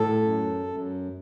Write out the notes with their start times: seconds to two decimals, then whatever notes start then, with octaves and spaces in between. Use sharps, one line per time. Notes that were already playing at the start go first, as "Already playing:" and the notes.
Already playing: A2 A4
0.22 F#2
0.67 F#2